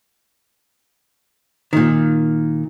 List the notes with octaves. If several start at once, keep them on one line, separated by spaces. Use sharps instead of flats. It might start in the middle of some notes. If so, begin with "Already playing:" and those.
A#2 D#3